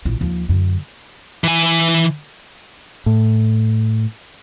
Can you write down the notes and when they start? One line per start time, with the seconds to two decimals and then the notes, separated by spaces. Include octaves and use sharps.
0.05 A#1 E4
0.21 D#2 F3
0.49 F#2 D3
1.44 E3 G#5
3.06 A2